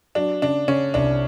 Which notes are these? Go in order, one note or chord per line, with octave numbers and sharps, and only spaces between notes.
F#3 D4
C#3 D4
C#3 C#4
C2 D4